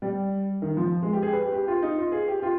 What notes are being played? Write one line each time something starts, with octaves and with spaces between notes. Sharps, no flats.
G3
D#3
F3
G#3
G4
G#4
B4
G4
G4
F4
D#4
F4
G#4
G4
F4